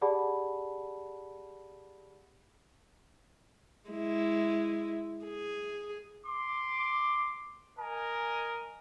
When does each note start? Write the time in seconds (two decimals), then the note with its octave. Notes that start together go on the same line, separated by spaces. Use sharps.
0.01 G4 G#4 D5 F#5 A5 B5
3.90 G#3 E4
5.24 G#4
6.26 C6 D6
7.78 A#4 D#5 G#5